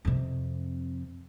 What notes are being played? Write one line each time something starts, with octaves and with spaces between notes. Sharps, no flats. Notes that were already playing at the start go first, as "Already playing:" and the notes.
F2 C3